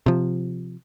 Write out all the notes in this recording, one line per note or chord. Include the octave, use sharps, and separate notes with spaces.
C3 F3